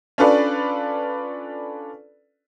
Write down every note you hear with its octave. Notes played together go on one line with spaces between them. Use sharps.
C#4 D4 F4 A4 B4 D5